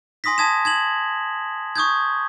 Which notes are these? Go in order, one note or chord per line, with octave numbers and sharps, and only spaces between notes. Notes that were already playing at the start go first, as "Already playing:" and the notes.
G#5 C6 D#6 A#6 B6
A5 D#6 G#6 B6 E7
G#6 E7 F#7
C#6 D#6 G6 G#6